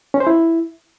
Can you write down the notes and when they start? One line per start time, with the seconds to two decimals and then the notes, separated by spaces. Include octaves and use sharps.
0.14 C#4
0.20 C5
0.27 E4